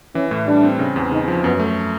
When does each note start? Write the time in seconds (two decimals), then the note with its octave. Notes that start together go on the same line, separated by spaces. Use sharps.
0.15 E3 C#4
0.31 A2
0.47 G3 D4
0.63 C4
0.79 C#3
0.96 E2
1.11 C#3 D#4
1.28 F3
1.44 F#2 B3
1.59 A3